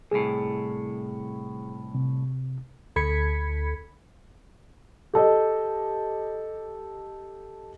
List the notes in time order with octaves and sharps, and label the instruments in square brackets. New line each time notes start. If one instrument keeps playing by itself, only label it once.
[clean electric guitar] C2 A2 [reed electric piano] G#4
[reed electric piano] C3
[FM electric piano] D2 A4 B5 G#6 B6 C#7
[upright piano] G4 A4 D#5